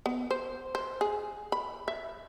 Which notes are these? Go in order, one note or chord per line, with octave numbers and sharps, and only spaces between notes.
B3
C5
C5
G#4
B5
E5